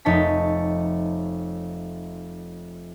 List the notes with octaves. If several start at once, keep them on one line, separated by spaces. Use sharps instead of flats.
F1 D#4 C#5 A5 B6